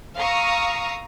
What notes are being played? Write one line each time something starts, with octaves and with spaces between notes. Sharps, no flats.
F5 A#5 C#6 D#6 E6